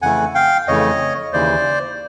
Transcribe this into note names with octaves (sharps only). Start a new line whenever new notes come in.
F2 C#3 E3 A3 F#5 G#5
F5 G5
F2 C#3 E3 A3 C#5 D#5
D#2 C#3 E3 C5 D5